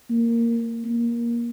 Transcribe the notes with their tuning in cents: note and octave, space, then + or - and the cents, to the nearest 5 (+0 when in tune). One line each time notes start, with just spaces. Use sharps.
A#3 -5
A#3 +15